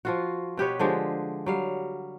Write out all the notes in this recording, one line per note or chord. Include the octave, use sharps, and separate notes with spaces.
F3 F4 F#4
B2 G4 B4 C#5
D3 F3 G#3 G4
F#3 G3 F5